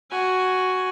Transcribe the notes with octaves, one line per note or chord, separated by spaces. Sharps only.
F#4 G#5